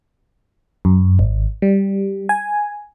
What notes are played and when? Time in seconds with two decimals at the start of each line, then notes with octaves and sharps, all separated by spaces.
0.85 F#2
1.19 G#1
1.62 G3
2.29 G#5